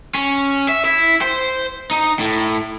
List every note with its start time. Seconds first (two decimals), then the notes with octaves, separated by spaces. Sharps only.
0.15 C#4
0.69 E5
0.85 E4
1.22 C5
1.91 D#4
2.20 A2